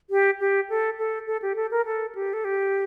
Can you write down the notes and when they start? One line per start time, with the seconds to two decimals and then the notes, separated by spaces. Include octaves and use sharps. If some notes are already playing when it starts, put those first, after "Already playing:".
0.10 G4
0.40 G4
0.70 A4
0.99 A4
1.27 A4
1.42 G4
1.56 A4
1.71 A#4
1.86 A4
2.15 G4
2.33 A4
2.45 G4